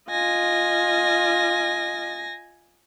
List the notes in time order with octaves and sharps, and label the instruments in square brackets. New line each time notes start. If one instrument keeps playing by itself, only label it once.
[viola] F4 D#5 [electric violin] G#5 A#6